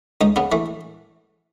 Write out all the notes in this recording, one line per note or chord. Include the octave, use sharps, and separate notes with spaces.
C#2 D#4
C#3 B3
E3 A3